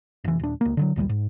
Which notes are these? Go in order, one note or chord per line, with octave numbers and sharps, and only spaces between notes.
F1 E3
D#1 D4
C#2 A#3
D3 D#3 F#3
A#1 D#2 F3 G3
G#2